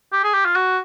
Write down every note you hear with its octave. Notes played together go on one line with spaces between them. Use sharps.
G4
G#4
G4
F4
F#4